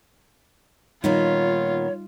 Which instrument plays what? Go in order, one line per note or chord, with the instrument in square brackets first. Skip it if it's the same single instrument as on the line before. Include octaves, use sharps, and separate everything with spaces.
[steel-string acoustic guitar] A#2 D#3 B3 [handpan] G3 D#4 [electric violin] F4 [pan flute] C#5